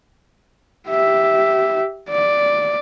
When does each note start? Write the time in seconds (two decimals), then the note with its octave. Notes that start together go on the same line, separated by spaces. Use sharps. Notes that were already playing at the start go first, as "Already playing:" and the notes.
0.89 G4 E5
2.10 D5